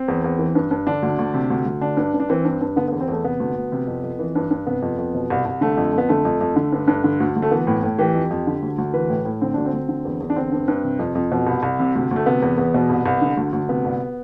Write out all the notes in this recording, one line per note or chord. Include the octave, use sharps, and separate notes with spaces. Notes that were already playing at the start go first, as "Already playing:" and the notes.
Already playing: C4
E2
E2
E3
G2
G2
D3 D4
D2
D2
C3
D2
D2
D3 D4
G2
G2
D4
E3 C4
G2
G2
D3 B3
B3
E2
C4
E2 A3
C3 B3
D2
D2
C3
F2
F2
E3
G2
G2
C3 B3
F2
F2
B2
C2
C2
D3 A3
F2
F2 B3
D3 A3
F2
F2
D3
G2
G2
D3
D2
D2
A3
E3 B3
A2
A2
E3 G4
F2
F2
D3
D2
D2
E3 B4
A2
A2
D3 C4
D2 D4
C4
D2
D3
E2
E2
D4
D3 C4
G2
G2
C3
F2
F2
B2
C2
C2
C3
D2
D2
A3
C3 B3
E2
E2
B2
C2
C2
D3
D2
D2
C3 B3
C2